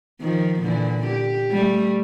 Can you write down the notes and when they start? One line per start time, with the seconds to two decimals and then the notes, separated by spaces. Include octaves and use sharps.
0.21 D#3 F3
0.61 A#2 D3 E3
1.06 G4
1.51 G3 A3